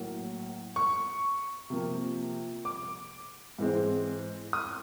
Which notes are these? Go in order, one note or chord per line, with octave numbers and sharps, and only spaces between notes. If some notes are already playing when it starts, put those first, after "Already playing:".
Already playing: A2 F#3 A#3
C#6
C3 F3 A#3
D6
G#2 E3 G#3 C4
D#6